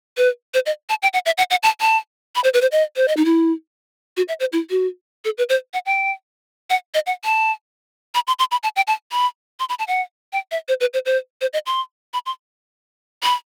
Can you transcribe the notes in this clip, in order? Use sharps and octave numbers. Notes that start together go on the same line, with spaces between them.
B4
C5
D#5
A5
G5
F#5
E5
F#5
F#5
A5
A5
B5
C5
B4
C5
D#5
C5
D#5
D#4
E4
F#4
E5
C5
E4
F#4
A4
B4
C5
F#5
G5
F#5
D#5
F#5
A5
B5
C6
C6
B5
A5
G5
A5
B5
C6
B5
A5
F#5
G5
E5
C5
B4
C5
C5
C5
D#5
C6
B5
C6
B5